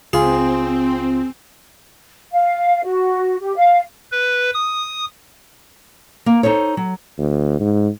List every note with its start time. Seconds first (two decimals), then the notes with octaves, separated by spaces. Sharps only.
0.13 C#2 C4 F4 G#4 C6
2.32 F5
2.84 F#4
3.39 G4
3.56 F5
4.11 B4
4.54 D#6
6.26 A#3
6.43 D#4 A4 C5 C#5
6.77 F#3
7.18 D2
7.60 G#2